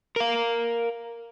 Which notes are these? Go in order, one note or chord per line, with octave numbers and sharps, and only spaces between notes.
A#4 F5